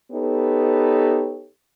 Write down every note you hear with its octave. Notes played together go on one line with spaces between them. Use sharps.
B3 D#4 G4 A4 B4 C#5